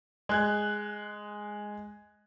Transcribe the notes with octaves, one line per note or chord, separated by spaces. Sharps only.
G#3 F#6 G#6